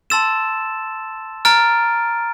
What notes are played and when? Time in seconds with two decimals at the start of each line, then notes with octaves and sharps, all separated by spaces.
0.10 A5 C6 E6 A6 E7
1.45 A#5 F6 A6 D7